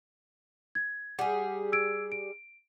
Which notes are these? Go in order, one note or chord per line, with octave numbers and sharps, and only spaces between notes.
G#6
G3 G#4 F#5
E6 G#6 D7
D7